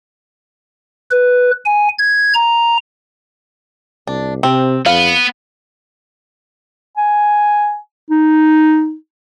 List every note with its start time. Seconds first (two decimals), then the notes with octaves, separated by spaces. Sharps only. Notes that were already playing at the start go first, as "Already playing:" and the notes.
1.11 B4
1.65 G#5
1.99 G#6
2.34 A#5
4.07 C2 D4
4.43 C3 C4
4.86 F2 B3 F5
6.97 G#5
8.10 D#4